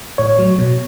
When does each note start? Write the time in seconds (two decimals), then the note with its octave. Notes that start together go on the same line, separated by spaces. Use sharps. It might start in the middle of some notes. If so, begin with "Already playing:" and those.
0.18 A2 C#5
0.39 F#3
0.59 B2